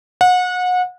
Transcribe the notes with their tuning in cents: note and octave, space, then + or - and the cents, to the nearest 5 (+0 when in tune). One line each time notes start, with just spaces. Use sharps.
F#5 -30